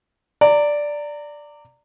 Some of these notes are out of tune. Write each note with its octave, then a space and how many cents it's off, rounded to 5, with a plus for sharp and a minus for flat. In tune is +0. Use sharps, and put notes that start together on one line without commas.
D5 +0 A#5 -25